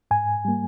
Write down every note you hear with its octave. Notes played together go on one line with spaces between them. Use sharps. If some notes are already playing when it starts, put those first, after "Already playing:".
G#2 G#5
G3 A#3